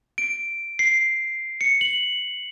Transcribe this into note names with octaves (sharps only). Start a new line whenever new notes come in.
D7
C7
C#7
F#7